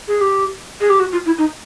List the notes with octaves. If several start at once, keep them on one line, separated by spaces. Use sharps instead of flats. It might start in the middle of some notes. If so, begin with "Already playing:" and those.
G#4
G4
G#4
G4
F#4
F4
E4
D#4